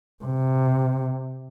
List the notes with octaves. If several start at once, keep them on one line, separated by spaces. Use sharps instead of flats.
C3